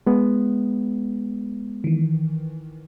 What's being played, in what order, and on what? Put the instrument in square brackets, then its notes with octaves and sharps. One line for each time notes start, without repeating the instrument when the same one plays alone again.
[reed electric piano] G#3 B3
[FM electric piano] D#3 E3